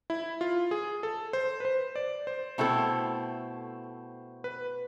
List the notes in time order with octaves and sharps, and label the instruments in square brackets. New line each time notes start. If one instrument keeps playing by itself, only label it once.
[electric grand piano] E4
F4
G#4
A4
C5
B4
C5
D5
C5
[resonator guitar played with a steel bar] B2 A3 C4 E4 A4
[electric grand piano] B4